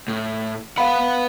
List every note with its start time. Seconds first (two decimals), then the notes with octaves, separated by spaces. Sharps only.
0.08 A2
0.78 B4 F5 F#5 B5